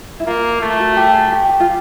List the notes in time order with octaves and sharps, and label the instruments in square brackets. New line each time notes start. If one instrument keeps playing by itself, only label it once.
[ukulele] E4
[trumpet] A#3 [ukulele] F4
[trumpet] A3 [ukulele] F4
[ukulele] F#4
G4
G#4
G4
G4
F4